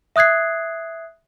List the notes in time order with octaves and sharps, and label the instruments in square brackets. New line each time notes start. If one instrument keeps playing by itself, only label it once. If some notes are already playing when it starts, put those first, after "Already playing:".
[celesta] E5 D#6 F#6 G#6 C7